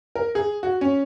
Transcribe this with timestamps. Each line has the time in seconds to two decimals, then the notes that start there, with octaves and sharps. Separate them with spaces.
0.15 A#4
0.35 G#4
0.63 F#4
0.81 C#4